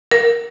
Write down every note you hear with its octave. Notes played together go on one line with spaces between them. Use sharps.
A#4